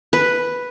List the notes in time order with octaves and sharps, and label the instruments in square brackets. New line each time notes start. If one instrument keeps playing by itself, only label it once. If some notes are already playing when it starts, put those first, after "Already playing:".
[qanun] B4